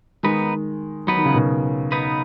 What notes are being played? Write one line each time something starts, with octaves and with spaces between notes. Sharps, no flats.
D#3 G#3 B3 D#4 B4
F#3 B3 D#4 B4
D#3
C#3
B2 D#3
B3 D#4 B4